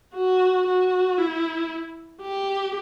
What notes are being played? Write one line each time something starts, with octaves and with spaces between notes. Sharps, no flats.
F#4
F#4
E4
G4